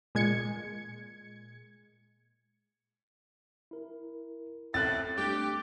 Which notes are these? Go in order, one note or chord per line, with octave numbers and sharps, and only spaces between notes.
A#2 G#3 G#6 C#7
E4 A#4
A2 C4 F#6 A6
G3 A3 D4 G4